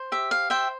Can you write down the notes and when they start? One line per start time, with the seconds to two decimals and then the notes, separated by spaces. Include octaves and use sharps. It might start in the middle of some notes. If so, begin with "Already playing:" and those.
Already playing: C5
0.12 G4 E5
0.31 F5
0.50 C5 E5 G5